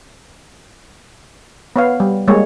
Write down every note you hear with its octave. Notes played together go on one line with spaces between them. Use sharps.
B3 C#5 F5
G3
G3 G#3 A#3 C#5